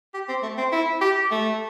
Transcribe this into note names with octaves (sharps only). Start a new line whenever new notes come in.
G4
C4
A3
C4
E4
G4
A3